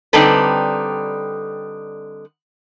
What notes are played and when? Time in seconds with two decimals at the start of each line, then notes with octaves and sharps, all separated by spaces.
0.13 D3 G3 C4 D#4 A4 B4